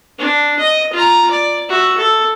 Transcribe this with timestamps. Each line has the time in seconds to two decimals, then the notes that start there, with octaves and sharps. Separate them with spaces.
0.19 D4
0.59 D#5
0.93 F4 A#5
1.31 D5
1.69 F#4 E5
1.99 A4